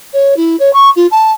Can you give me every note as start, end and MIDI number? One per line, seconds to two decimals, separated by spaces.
0.13 0.34 73
0.36 0.56 64
0.59 0.70 73
0.73 0.90 85
0.96 1.06 65
1.11 1.32 81